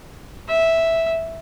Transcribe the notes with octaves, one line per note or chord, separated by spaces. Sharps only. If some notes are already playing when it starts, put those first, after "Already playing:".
E5